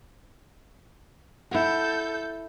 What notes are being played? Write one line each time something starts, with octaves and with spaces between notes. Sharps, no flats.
E4 A4 F#5 G6